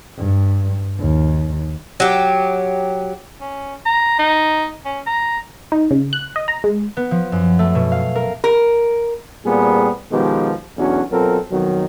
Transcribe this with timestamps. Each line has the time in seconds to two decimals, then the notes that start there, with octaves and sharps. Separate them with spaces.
0.18 G2
1.00 D#2
2.00 F#3 G4
3.40 C#4
3.86 A#5
4.19 D#4
4.85 C#4
5.06 A#5
5.72 D#4
5.91 C#3
6.13 F#6
6.36 D#5
6.48 A#5
6.64 G#3
6.97 B3
7.11 F3
7.32 F#2
7.59 A3
7.75 B2
7.92 F5
8.15 A#4
8.44 A#4
9.45 A#2 G3 B3 C4 G#4
10.12 B2 D#3 F3 G#3 B3 G4
10.78 B1 E2 C#4 D4 F#4
11.11 B2 F#3 C4 F4 A4 A#4
11.51 F2 B2 D#3 F#3